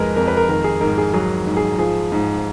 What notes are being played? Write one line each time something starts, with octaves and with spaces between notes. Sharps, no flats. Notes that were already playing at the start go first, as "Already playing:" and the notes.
Already playing: F2 G#3 A#4 B4
F2 A#4
B4
A#4
D#3 A#4
G#4
G#2 A#4
G#4
F#3 G#4
G#2
G#4
F3 G#4
G#2